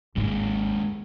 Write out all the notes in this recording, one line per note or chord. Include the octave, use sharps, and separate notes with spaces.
G#1 D#2 G#2 G#3